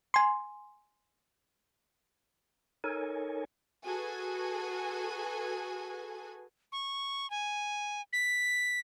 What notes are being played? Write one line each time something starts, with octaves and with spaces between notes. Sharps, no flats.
G#5 C6
D#4 A4 A#4 C#5 G#5
F#4 G#4 A4 B4 G#5
C#6
G#5
B6